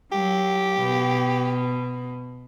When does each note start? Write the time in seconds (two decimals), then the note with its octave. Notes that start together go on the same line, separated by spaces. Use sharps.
0.12 F#3 G4
0.80 B2